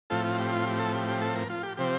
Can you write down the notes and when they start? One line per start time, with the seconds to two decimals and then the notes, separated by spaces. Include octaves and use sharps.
0.10 A2 F3 C4 F4 A4
0.24 F4
0.39 G4
0.52 F4
0.66 G4
0.80 A4
0.94 G4
1.08 G4
1.22 A4
1.35 A#4
1.50 F4
1.63 G4
1.77 C3 F3 C4 G4